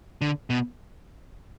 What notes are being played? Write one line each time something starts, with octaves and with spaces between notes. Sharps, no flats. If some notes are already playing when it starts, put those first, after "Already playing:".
D3
B2